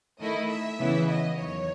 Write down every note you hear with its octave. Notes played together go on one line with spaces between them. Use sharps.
D#3 A3 E4 D#5
E5
C#3 E3 B3 E4
D#5
E2 D#3 F#3 C#5